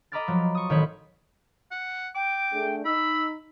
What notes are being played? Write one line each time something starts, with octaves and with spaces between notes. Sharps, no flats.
D#5 A#5 B5 D6 F6 A6
F3 F#3
C#6 D#6
A1 D#3 C5 C#5 B5
F#5
G5 D6
A3 D4 G#4
D#4 B5 E6